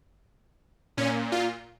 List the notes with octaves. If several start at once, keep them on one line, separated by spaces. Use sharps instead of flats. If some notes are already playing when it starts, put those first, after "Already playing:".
A#2 C#4
F4